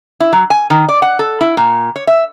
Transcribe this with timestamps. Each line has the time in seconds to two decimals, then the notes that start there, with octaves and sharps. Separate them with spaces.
0.20 E4
0.33 F#3
0.50 G#5
0.70 D#3
0.89 D5
1.02 F#5
1.19 A4
1.41 E4
1.57 A#2
1.96 C#5
2.07 E5